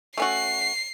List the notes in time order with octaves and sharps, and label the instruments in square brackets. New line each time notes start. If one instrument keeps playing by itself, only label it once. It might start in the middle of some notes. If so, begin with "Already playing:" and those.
[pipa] A3 C#4 F#4 [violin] C7